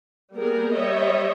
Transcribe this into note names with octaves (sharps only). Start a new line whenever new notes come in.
G3 A#3 B3 G#4 A#4
G3 C#5 D#5 E5